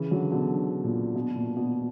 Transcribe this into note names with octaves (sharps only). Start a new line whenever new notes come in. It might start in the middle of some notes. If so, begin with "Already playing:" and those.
Already playing: C#3 E3
D3 F#3
B2 D3
A#2
B2
A#2
B2